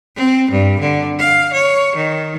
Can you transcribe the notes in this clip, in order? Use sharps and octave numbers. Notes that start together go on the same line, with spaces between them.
C4
G2
D3
F5
C#5
D#3